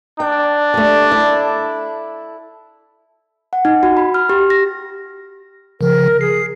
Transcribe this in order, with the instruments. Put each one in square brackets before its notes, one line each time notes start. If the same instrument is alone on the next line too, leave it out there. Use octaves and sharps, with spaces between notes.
[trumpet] D4 [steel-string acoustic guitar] G5
[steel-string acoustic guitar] G3 A3
E4 A4
[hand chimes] F#5
D#4
F#4
B5
F6
G4
A#6
[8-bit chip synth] C#3 F3 [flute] A#4
[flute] G#4 [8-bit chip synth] C7